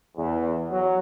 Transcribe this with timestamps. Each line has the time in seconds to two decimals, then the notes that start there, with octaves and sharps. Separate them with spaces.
0.16 E2
0.70 F#3